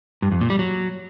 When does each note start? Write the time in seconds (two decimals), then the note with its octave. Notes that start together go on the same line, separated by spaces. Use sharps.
0.22 G2
0.32 F2
0.41 A#2
0.50 G3
0.59 F#3